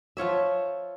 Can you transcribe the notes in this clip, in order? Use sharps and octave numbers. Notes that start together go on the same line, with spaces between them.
F3 F4 C#5 E5